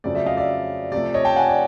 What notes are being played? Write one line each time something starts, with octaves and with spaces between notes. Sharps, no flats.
F2 C#3 F#3 A3 C4 D5
D5 E5
D#5 F5
D5 E5
C3 F3 A3 D5
C#5 D#5
G5 A5
F#5 G#5
D5